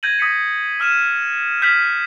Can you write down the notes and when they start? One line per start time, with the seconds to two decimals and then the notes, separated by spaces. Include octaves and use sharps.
0.03 G6 G#6 A#6 D#7 F#7
0.19 D#6 A#6 B6 C#7
0.80 E6 F6 D#7 E7
1.62 F6 G6 B6 D#7 F7 F#7